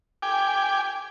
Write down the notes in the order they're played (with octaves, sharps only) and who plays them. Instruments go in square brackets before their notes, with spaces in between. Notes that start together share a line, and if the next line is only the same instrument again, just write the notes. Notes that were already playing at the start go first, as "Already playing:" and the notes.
[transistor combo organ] G5 G#5 D6